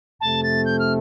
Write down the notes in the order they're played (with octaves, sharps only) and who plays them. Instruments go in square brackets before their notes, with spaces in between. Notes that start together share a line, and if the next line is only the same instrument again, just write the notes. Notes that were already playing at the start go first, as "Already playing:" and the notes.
[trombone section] F2 C3 A3 [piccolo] A5
[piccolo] A6
G6
F6